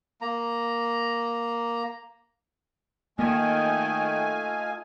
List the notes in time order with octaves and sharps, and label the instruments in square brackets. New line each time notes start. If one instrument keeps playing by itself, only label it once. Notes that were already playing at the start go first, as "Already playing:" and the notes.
[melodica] A#3 A#5
[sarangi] D#3 [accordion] A3 G#5 [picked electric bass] A#3 [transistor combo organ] F4 D#5 F5